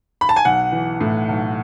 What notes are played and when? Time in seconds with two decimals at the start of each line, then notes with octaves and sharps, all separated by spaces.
0.21 B5
0.29 A5
0.36 G#5
0.45 B1 F#5
0.72 E3
1.00 A2
1.29 B1